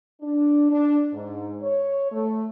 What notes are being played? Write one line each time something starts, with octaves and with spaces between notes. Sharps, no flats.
D4
D4
G#2
C#5
A3